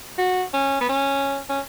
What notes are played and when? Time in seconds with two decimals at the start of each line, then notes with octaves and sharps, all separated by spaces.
0.18 F#4
0.53 C#4
0.81 B3
0.89 C#4
1.49 C#4